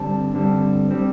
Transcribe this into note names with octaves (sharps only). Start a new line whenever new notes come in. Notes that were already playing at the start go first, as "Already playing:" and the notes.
Already playing: G2 D3 G3 C4 A5
G2 D3 G3 C4
G3 C4